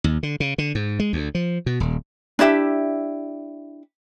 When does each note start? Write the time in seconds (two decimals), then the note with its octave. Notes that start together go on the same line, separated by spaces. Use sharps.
0.04 D#2
0.23 D3
0.40 C#3
0.58 D3
0.75 G#2
0.99 G#3
1.13 D2
1.35 F3
1.66 B2
1.80 D#1
2.39 D4 E4 G4 E5